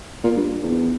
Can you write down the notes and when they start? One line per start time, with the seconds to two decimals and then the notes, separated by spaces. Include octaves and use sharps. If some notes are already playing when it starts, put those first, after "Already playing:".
0.24 A#2
0.36 G2
0.63 E2